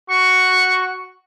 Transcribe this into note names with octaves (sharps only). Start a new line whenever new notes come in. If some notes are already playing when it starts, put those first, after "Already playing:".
F#4 C#6